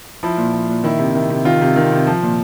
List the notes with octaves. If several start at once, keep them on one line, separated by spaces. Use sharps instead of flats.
F3 E4
A#2
F3
A#2
D#3 E4
C3
D#3
C3
D#3 F4
C3
D#3
C3
F3
A#2